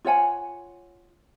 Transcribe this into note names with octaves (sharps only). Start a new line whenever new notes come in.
F4 C#5 F#5 G#5